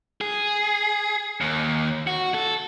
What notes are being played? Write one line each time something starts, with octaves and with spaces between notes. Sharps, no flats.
G#4
D#2
F#4
A4